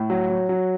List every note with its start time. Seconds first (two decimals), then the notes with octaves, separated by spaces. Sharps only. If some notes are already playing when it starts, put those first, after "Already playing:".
Already playing: A2
0.10 F#3
0.30 F#3
0.49 F#3